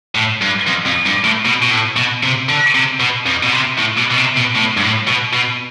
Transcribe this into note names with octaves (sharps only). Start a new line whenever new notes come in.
A2
G2
F2
F2
G2
A2
B2
B2
A2
B2
C3
D3
C3
B2
F2
B2
C3
A2
B2
B2
C3
B2
A2
G2
A2
B2
B2